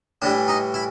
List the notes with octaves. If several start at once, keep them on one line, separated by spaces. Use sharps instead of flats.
A2 E3 G3 D4
D#4
E4